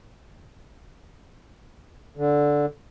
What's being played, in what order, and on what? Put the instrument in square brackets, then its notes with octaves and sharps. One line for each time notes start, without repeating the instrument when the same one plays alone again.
[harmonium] D3